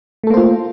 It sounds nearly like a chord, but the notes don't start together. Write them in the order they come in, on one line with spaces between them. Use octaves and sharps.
A3 A4 A#3 C5 F4